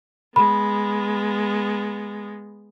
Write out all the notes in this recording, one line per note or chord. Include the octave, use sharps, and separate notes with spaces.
G#3 B3 B5